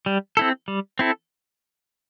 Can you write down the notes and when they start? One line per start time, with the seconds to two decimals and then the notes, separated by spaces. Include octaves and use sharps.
0.06 G3
0.37 C4 E4 A4
0.68 G3
0.99 C4 E4 A4